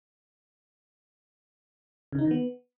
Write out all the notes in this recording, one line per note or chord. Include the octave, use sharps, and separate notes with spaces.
C#3
D#4
D#3
B3